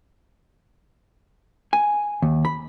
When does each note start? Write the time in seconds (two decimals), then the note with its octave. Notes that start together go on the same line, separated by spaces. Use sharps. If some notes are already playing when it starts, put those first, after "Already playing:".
1.73 G#5
2.22 D#2
2.45 B5